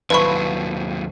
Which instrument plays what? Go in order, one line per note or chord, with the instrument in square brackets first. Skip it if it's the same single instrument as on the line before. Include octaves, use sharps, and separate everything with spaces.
[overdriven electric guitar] D#2 F#3 [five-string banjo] F3 E4 B5 [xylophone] B4 C#6